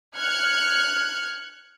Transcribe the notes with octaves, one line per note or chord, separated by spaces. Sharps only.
F6 F#6 G#6 C#7